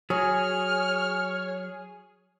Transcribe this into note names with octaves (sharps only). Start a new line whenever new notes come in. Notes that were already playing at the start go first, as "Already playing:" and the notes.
F#3 G#4 C#5 F6